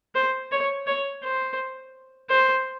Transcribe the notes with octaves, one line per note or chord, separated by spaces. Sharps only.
C5
C#5
C#5
C5
C5